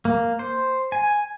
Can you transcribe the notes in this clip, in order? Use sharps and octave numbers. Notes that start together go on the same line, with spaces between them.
A#3
C5
G#5